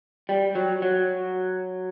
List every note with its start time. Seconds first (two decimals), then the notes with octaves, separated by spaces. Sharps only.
0.29 G3
0.55 F#3
0.82 F#3